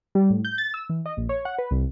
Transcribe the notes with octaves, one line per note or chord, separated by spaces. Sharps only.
G3
A2
G6
A6
E6
E3
D#5
A#1
C#5
F#5
B4
C2